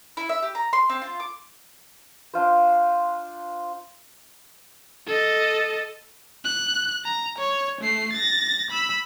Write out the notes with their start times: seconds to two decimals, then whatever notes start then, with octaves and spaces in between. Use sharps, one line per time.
0.17 E4
0.29 E5
0.43 G4
0.55 A#5
0.73 C6
0.90 C4
1.02 F4
1.20 D6
2.34 D4 F4 C5
5.07 A4 D#5
6.45 F#6
7.05 A#5
7.38 C#5
7.81 A3 C7
8.12 A6 A#6
8.70 B5 E6